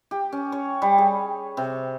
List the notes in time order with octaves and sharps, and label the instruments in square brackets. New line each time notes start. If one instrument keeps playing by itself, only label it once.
[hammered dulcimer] G4
C#4
C#5
G3
G#4
C3